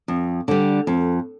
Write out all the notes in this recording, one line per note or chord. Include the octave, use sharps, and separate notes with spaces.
F2
D3 G3
F2